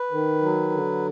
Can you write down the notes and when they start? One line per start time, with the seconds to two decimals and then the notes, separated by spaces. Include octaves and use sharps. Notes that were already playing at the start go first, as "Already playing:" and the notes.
Already playing: B4
0.11 D#3
0.41 F#3
0.71 D3